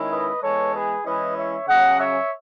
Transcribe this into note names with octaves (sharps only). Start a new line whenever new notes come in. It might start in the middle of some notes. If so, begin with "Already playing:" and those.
Already playing: D#3 G#3 C#4 E4
B4 D#5
E3 G#3 B3 A4 C#5
G#4 B4
E3 G#3 C#4 E4 B4 D#5
C#5 E5
C#3 F#3 C#4 D#5 F#5
C#5 E5